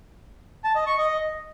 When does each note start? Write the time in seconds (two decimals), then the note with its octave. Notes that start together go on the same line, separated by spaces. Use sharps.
0.64 A5
0.75 D#5
0.87 C#6
0.98 D#5